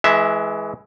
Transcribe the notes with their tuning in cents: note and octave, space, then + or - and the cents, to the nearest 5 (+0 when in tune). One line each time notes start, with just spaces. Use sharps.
E3 +0 G#3 +25 E5 +0